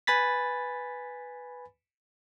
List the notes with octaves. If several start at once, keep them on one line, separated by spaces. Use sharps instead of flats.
B4 G#5 B5 A6 B6